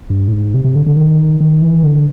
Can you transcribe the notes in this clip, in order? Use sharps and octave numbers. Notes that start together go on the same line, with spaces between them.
G2
A2
G#2
C3
C3
D3
D3
D#3
D#3
E3
D3